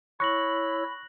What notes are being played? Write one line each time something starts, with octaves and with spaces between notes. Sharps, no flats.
E4 C#5 B5 C#6 E6 F#6 A#6 F#7